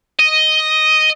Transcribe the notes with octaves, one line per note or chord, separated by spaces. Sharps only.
D#5